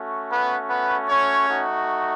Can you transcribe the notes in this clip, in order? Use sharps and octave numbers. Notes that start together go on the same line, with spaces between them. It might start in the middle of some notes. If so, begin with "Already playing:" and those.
Already playing: A3 C#4 F#4
B3 B4
B3 B4
C#4 C#5
A3 D#4 F#4